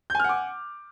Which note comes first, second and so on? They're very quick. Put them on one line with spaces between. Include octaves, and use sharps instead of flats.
G6 G#5 F6 F#5 D6